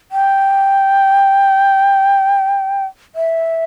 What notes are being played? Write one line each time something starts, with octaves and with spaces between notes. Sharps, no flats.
G5
E5